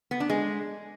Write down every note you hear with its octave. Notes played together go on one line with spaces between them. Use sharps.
B3
D4
G#3